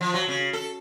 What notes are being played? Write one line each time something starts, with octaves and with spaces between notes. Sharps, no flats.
F3
F#3
C#3
A4